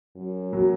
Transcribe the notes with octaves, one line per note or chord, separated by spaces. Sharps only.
F#2
F#3